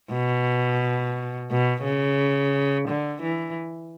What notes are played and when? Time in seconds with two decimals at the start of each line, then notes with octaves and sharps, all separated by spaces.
0.12 B2
1.51 B2
1.84 C#3
2.88 D3
3.22 E3